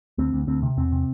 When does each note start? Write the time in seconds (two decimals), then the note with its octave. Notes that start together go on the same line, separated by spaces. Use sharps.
0.18 D2 C4
0.33 D2
0.47 D2 C4
0.63 C3
0.77 E2 C4
0.92 C3